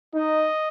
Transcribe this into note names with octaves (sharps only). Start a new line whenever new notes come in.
D#4 D#5